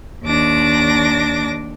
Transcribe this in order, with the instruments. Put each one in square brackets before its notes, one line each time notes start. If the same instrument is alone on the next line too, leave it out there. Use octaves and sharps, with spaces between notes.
[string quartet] D#2 D4 D6 A#6